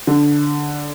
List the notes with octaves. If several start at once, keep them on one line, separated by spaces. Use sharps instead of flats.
D3